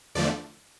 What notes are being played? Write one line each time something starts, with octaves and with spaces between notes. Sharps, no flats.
E2 D3 F3 A3 D5